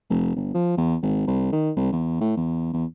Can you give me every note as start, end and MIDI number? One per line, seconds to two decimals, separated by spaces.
0.09 0.32 29
0.36 0.51 31
0.54 0.77 53
0.77 0.96 40
1.02 1.23 32
1.27 1.50 36
1.52 1.71 51
1.76 1.90 36
1.92 2.20 40
2.21 2.33 45
2.36 2.71 40
2.73 2.85 40